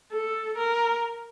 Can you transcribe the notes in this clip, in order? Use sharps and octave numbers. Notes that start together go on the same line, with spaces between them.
A4
A#4